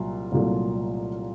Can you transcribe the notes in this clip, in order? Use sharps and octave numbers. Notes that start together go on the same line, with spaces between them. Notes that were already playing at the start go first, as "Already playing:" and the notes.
Already playing: C2 A#2 F#3 F4
C2 A#2 F#3 A3